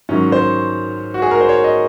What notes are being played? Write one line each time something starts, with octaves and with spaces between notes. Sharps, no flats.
G#2 D#3 F#3 C#4
C5
F#4
G#4
A#4
C5
C#5
D#5